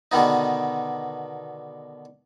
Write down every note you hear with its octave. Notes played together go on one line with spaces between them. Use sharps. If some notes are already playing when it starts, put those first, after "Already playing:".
B2 D3 D#3 B3 D#4